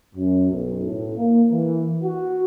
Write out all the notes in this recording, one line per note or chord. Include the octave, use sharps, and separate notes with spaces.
F#2
B1
A2
A#3
E3
F#4